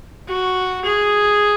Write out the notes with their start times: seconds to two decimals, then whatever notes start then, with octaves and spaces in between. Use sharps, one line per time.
0.28 F#4
0.85 G#4